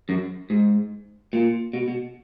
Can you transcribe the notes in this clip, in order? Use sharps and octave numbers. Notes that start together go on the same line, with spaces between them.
F#2
G#2
A#2
B2
B2